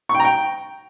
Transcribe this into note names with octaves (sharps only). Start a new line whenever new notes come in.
C#6
G5
A#5
G5